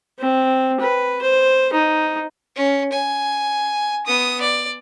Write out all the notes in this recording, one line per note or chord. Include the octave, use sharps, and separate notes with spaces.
C4
B4
C5
D#4
C#4
G#5
B3 D#6
D5